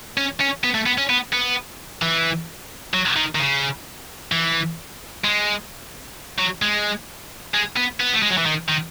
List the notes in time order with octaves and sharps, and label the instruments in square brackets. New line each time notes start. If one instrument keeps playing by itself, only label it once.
[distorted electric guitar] C#4
C#4
B3
A3
B3
C#4
B3
B3
E3
F#3
D#3
D#3
C#3
E3
G#3
F#3
G#3
G#3
B3
B3
A3
G#3
F#3
E3
D#3
D#3